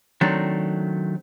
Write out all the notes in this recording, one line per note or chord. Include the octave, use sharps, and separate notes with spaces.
D#3 F#3 A3 C4 D4